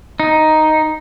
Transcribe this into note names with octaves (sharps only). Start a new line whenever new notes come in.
D#4